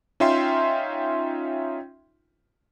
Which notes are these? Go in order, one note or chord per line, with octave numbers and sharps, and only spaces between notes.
C#4 D#4 F4 E5 G5 C6